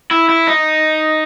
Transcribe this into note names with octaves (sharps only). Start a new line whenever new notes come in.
E4
E4
D#4